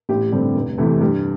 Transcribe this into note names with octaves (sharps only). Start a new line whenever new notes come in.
A1 G4
G2 D3 G3 C4
F1
E2 C3 E3 A3
G2 G4